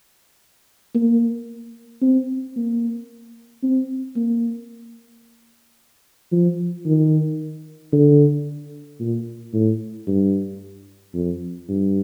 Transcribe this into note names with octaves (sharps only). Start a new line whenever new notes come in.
A#3
C4
A#3
C4
A#3
F3
D#3
D3
A#2
A2
G2
F2
G2